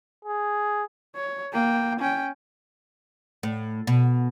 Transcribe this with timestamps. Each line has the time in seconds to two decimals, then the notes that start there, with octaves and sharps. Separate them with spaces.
0.25 G#4
1.16 C#5
1.52 A#3 G5
2.00 C#4 G5
3.43 A2
3.87 B2